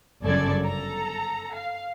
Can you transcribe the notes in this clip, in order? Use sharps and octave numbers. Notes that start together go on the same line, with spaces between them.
G1 F#2 C#3 A4 D5 G#6
A4 A#5
F5